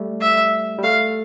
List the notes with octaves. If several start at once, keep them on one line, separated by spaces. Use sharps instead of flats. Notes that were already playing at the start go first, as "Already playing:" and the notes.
Already playing: G3 A3
E5
G3
A3 F5